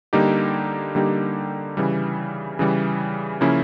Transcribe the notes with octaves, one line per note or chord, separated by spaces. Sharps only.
D3 G3 A#3 D#4 G4
D3 G3 A#3 D#4 G4
C#3 E3 G3
C#3 E3 G3
C#3 F3 A#3 C#4 E4